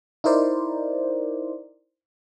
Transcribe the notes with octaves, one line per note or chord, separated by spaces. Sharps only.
D#4 E4 A#4 C5 D5